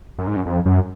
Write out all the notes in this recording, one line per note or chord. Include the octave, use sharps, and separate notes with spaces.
F#2
G#2
F#2
F2
F#2